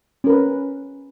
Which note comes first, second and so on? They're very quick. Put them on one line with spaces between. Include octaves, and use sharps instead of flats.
C#4 A#4 B4